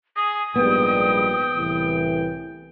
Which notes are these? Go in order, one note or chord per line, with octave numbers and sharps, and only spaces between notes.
G#4 D#6
A#1 G#2 G3 B3 G5
C2 A2 E3